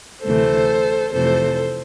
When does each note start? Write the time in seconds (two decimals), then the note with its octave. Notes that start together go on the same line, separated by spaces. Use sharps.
0.24 D2 C3 E3 A3 A4 C5
1.13 F2 C3 E3 A3 A4 C5